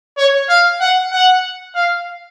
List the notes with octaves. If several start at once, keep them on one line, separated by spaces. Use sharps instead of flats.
C#5
F5
F#5
F#5
F5